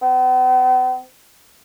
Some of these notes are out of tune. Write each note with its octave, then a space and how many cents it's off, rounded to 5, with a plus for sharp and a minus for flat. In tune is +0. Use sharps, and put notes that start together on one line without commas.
B3 +45